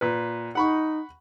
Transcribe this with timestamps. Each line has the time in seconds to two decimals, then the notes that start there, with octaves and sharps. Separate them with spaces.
0.01 A#2 B4
0.55 D#4 F#5 B5 C#6